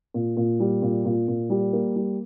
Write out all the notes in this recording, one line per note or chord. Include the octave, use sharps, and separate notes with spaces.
A#2
A#2
G3
A#2
A#2
A#2
G3
A#3
G3